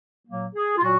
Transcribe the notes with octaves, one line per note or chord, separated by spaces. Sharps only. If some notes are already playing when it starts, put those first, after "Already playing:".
A#2 F#3 A#3
G#4
F4
A#2 F#3 F#4